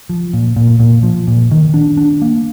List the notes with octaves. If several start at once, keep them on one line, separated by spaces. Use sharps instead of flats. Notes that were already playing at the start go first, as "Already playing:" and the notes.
F3
A#2
A#2
A#2
F3
A#2
D#3
D4
D4
A#3